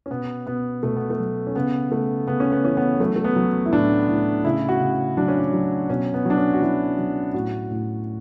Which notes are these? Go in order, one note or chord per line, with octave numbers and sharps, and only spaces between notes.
C#4
B2 B3
B2 B3
B2 A3
B3
A3
F#3
C#4
C#3 B3
C#3 A3
C#3 B3
C#4
B3
E3 C#4
B3
F#3 A3
A3
B3
F#3
E4
A2 D4
A2
C#3 E4
F#4
C#3
F#3 D4
C#4
D4
F#3
B2 C#4
B3
F#3 D4
C#4
F#4
F#3 E4
F#3
A2 F#4
A2